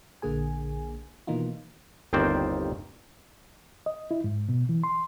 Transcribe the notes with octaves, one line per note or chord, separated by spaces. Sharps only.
A#1 D3 A#3 G#4 G#5
B2 D#3 E3 A#3 D#4 F4
G1 D#2 D#3 C4 C5 D5
D#5
E4
G#2
B2
E3
C6